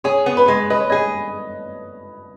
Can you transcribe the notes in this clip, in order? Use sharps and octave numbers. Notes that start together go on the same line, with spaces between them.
G#4 C#5
B3
B4
G#3
B4 D#5
C#5
G#4 D#5